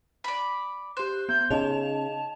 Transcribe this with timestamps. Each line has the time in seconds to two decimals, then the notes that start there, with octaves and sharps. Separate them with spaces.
0.24 D5 B5
0.97 G4 C5 F#6
1.29 B3 G6
1.50 C#3 D#4 D#5 A5 F7